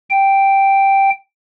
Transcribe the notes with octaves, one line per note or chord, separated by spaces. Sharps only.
G5